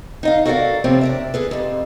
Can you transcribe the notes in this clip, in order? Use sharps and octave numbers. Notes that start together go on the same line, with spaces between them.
D#4 D#5 F5
F#4 A4 A#4 C5 D5 F5
A2 C3 F3 A3 C4 C#4
D4 A#4 E5
G#4 A4 B4
F2 C3